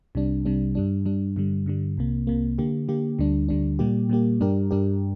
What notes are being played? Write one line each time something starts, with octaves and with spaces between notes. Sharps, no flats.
C2 C3 G3 D4
C2 C3 G3 D4
G2 G3 D4
G2 G3 D4
G2 D3 G3
G2 D3 G3
C2 C3 A#3
C2 C3 A#3
D3 A#3 G4
D3 A#3 G4
D2 D3 G3 D4
D2 D3 G3 D4
A#2 G3 A#3 G4
A#2 G3 A#3 G4
G2 G3 D4 G4 A#4
G2 G3 D4 G4 A#4